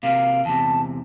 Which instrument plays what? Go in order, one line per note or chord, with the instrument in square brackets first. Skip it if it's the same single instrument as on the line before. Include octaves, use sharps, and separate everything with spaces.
[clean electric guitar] C3 A#3 [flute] F5
[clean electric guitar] E2 C3 [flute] A5